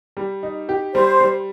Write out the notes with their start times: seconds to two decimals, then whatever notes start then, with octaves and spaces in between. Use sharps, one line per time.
0.17 G3
0.43 D#4
0.69 G4
0.94 G3 C5
1.20 G3